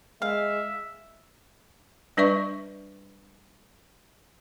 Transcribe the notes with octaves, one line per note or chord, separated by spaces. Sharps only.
G#3 E5 F5
G3 D4 B4 D5 E5 C#6